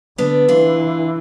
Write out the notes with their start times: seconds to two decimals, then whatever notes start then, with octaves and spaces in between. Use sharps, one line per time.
0.18 D3 B3 D4
0.48 E3 D4 F4